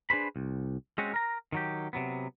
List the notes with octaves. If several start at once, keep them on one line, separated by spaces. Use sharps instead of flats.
D4 G#4 B4 C5 B5
C2
G#3 C4 C#4 F#4
A#4 A#5
D#3 F#3 G4
C3 F#3 B3